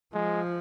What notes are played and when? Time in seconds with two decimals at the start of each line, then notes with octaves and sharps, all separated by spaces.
0.14 F3 G#3